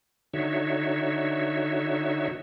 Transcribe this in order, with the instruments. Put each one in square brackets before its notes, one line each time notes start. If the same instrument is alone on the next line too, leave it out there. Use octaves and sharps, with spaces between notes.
[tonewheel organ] D3 D#4 F#4 C#5 E5